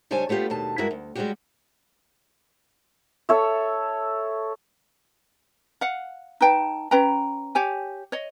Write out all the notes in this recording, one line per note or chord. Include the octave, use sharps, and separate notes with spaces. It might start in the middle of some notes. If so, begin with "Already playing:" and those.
C#3 G3 D4 C5 C#5 G#5
A3 B3 F4 G4 D5
D#2 B2 A5
G2 G#3 E4 F#4 A#4 G5
D2
G3 G#3 C#4 D4 F#4 G4
A4 C#5 E5
F5 F#5
D#4 B4 G5 A5
C#4 B4 G5 A#5
G4 C#5 G#5
C#5 D#5